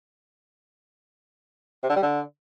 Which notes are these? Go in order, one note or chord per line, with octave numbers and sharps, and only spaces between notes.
C3
D3
G3
D3